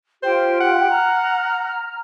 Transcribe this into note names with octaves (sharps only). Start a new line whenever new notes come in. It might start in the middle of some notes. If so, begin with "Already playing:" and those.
F4 G4 C5 G5
F#5
A#5 F6